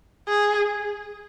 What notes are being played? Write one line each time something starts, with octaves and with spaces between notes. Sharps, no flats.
G#4